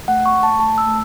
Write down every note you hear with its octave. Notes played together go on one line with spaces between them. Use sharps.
A3 F#5
C#6
A3
A5
A3 A5
E6
A3